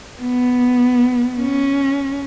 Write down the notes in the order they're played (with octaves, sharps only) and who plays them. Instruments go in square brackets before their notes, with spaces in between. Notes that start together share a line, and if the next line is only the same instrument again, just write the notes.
[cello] B3
C#4